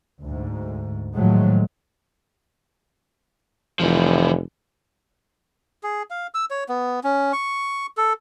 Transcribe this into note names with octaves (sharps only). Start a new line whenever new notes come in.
D2 G#2
A2 D#3 F3 F#3 G#3 A3
F1 E3 F3
G#4
F5
E6
C#5
B3
C#4
C#6
A4